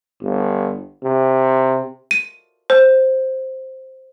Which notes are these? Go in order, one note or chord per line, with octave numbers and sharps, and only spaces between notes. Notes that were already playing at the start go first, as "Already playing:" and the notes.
G1
C3
D#7
C5